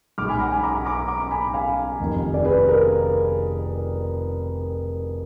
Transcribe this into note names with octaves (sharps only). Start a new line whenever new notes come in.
B1 B2 G#3 D6 F6
G#5 B5
F#5 A#5
G#5 B5
A#5 D6
A#5 D6
A#5 D6
G#5 B5
F5 G#5
F1 F2 D#3
D5
G#4 B4
A#4